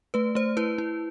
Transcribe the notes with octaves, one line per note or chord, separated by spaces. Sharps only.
A3 B4
A3 C5
E4 B4
E4